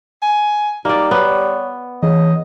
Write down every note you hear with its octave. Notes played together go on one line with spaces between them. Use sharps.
G#5
G3 A#3 D#4 D5
B3 C#5
C#3 E3 D#5